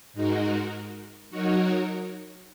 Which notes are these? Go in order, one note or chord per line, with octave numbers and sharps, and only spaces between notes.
G#2 G#3 D#4 F#4 A#4
F#3 D#4 F#4 A#4 C#5